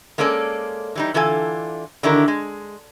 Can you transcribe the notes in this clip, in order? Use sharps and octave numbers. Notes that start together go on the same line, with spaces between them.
G#3 A#3 C#4 A4 D5
E3 G3 D#4
D3 E3 F4 A4 G#5
D3 D#3 D4 E4 G4 A#4
G#3